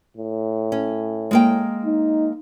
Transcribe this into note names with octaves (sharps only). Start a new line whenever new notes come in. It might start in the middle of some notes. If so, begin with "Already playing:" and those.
A2
C#4
G#3 A#3 G5
D#4